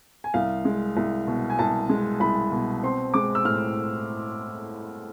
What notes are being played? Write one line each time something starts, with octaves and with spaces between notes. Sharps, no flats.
G#5
C2 F5
G#3
C2
B2
G#5
C2 A5
G#3
C2 B5
B2
C4 C6
G#3 D6
E6
A2 F6